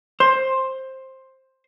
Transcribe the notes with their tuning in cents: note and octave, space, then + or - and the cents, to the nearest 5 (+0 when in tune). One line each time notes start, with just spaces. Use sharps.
C5 +10